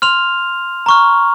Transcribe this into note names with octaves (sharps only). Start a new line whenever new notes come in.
C6 F6 F7
A#5 C#6 F6